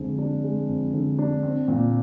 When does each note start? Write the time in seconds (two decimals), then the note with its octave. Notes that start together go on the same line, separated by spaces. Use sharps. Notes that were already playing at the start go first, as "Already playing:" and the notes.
Already playing: F2 D3 G#3
0.18 D4
0.44 G#3
0.68 F2
0.93 D3
1.19 D4
1.43 C4
1.68 A#2